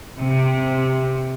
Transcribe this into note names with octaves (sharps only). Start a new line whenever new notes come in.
C3